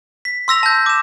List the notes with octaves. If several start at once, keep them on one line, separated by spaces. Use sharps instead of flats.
B6
C6 E6 A#6 F7
A5 G6
D6 E7